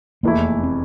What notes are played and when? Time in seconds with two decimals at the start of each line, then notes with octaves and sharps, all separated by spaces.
0.23 F1 E2 E3 A3 A#3 E4
0.63 C4